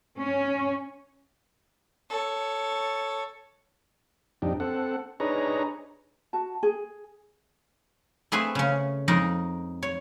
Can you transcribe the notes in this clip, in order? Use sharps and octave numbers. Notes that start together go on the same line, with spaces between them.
C#4
A4 C#5
F2 D4 D#4 G4
C4 A4 F#5
D4 D#4 G#4 B4 C#5 A#5
F#4 A5
G#4
A3 C4 G#4 B4 E5 G#5
C#3 C#4
F2 G#3 D#4 A#4 A#5
C#5